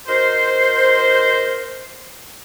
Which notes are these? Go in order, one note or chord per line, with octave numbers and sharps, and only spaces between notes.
D#4 F#4 A#4 C5